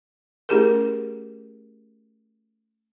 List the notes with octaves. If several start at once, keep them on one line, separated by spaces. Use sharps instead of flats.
A3 C#4 E4 G4 G#4 A#4